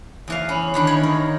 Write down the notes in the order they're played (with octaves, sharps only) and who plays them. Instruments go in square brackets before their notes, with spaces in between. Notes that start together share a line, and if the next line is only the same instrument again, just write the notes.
[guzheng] E2 E3 F5
[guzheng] C#4 [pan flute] B5
[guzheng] D3 D#3 D4
C#5
[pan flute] D#4 [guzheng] A#4